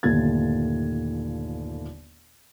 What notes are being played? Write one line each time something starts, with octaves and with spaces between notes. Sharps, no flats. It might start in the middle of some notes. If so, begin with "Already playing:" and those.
G1 D#2 A#2 A3 G#6 A6